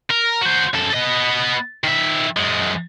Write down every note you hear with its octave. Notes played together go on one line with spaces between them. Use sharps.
A#4
F#4 C5
F#2 A4
B3 D#5
D#3 E5
F#2 G#3